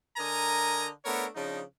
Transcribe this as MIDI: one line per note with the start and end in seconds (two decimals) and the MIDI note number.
0.17 0.88 50
0.17 0.88 70
0.17 0.88 75
0.17 0.88 80
0.17 0.88 82
1.05 1.25 57
1.05 1.25 59
1.05 1.25 62
1.05 1.25 70
1.05 1.25 73
1.35 1.60 49
1.35 1.60 53
1.35 1.60 62
1.35 1.60 63